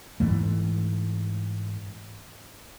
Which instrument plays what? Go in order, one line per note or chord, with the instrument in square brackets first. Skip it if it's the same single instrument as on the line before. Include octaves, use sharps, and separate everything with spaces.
[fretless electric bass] G#2 E3 A3